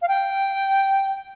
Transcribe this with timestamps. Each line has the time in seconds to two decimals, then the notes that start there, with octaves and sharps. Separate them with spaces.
0.02 F5
0.08 G5